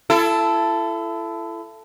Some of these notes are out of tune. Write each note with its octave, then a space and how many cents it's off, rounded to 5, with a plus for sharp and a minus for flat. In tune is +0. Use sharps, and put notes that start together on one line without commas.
E4 +35 A4 +0